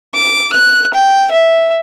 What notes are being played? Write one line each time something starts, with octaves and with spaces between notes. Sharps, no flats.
D6
F#6
G5
E5